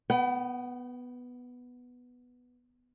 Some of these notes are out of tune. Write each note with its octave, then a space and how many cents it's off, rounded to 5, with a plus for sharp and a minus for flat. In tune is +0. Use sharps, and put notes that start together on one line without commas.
B3 +0 G5 -45